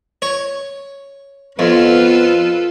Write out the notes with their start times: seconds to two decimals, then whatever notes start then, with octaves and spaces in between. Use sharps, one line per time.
0.22 C#5
1.59 F2 B3 F4 A4 B4